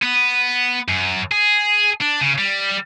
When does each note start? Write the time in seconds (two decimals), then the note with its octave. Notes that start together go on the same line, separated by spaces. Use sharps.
0.02 B3
0.88 F#2
1.32 G#4
2.01 D4
2.21 C#3
2.38 G3